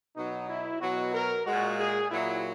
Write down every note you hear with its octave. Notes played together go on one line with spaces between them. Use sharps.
B2 F#3 D#4
E4
B2 F#3 F#4
A#4
A#2 G#3 F#4
G#4
A#2 F#3 E4